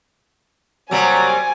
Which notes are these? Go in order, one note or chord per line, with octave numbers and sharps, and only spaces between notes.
C3 F#3 G3 A#3 G#5